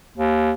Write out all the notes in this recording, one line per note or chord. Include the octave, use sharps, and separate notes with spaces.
D#2